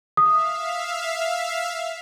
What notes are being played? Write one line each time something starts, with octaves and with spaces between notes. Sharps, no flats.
E5 F5 D#6